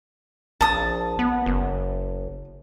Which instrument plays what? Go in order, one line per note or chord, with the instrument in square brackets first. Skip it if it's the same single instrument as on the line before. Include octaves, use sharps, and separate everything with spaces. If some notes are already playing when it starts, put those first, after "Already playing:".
[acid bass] A#1 [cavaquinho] A5 D#6
[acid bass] B3
F#1